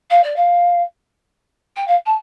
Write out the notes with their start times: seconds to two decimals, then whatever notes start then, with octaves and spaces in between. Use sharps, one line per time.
0.10 F5
0.23 D5
0.36 F5
1.76 G5
1.87 F5
2.06 A5